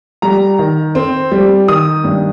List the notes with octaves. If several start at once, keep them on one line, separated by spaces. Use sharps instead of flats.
G3 A#5
D#3
C4
G3
D#3 D#6
G2